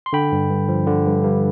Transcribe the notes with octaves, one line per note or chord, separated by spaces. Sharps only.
C6
D3 G5 B5
G2
G2
F3
D3
G2
G2